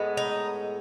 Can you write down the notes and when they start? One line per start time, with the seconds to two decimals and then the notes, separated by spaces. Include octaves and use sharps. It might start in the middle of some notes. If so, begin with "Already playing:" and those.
Already playing: A2 G#3 B3
0.17 D#4